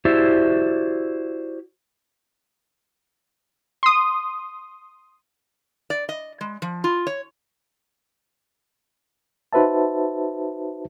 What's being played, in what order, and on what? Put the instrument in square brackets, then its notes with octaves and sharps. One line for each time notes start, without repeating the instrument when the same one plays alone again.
[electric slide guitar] E4 F#4 G4 C5 D5 E5
[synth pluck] C6 D#6
[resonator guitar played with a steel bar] D5
D#5
G#3
F3
F4
C#5
[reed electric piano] D#4 F#4 B4 C5 E5 A5